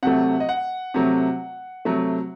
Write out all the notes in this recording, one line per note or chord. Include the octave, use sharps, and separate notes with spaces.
C3 F#3 A3 F#5
D#5
F#5
C3 F#3 A3
C3 F#3 A3